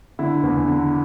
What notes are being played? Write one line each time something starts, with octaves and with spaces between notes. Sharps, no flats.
D3 E4
E2
D3